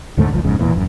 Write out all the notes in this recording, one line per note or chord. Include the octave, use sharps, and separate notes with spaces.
D2 G#2 D3 A3
F1 C#2 F3
G1 F2 G#2 C#3
D1 E2 A#2 E3
D#1 F#2